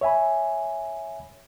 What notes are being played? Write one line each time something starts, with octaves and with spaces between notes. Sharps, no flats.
C#5 E5 G#5 B5